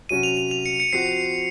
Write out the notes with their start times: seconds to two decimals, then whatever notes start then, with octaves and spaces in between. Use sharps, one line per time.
0.09 C3 F#3 C#4 F#4 D#7
0.23 F7
0.37 F7
0.51 F7
0.66 C#7
0.80 C#7
0.93 F3 C4 F#4 C7